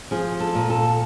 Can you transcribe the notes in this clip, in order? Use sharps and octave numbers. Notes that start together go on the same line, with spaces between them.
F3 G#4
A4
A#2
A4